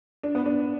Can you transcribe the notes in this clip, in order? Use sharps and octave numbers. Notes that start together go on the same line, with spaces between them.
D4
B3
D4